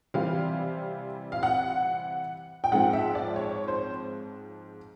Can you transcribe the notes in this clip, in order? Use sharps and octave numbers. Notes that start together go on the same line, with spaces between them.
C3 E3 G3 C4 F5
F5
F#5
G5
G#2 F3 G#3 C4 F#5
E5
D5
C#5
C5